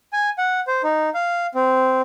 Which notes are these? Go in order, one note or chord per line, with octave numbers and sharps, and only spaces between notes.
G#5
F#5
C5
D#4
F5
C4